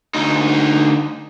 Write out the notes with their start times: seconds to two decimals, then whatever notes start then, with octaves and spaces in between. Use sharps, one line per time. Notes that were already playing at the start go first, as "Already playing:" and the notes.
0.14 D2 D#4